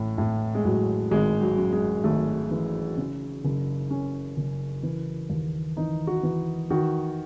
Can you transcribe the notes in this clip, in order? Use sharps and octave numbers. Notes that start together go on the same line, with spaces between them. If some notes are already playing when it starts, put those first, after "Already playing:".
Already playing: A1 A2
A2
G#3
A2 F#3
G#1 G#3
F#3
F#2
G#3
G#1 A3
E3
C#3
F#1
C#3 C#4
F#1
E3
D#2
E3 D#4
F#4
E3
D#3 F#4